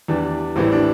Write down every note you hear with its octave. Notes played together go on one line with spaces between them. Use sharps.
E2 E3 G3 D4
A1 A2 E3 G3 C4
D4